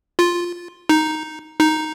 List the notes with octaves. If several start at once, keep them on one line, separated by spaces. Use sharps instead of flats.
F4
D#4
D#4